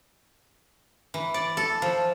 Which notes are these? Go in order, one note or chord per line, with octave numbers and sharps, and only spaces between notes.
E3
D5
A4
F3